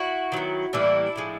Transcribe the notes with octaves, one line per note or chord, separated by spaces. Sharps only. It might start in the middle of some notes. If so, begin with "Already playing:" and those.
Already playing: E4 F#4
D#3 F#3 B3
A2 E3 G3 A#3 D4 E4
A2 F3 G#3